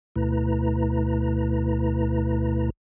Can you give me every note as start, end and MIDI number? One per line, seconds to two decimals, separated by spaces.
0.16 2.70 38
0.16 2.70 47
0.16 2.70 57
0.16 2.70 64
0.16 2.70 71
0.16 2.70 82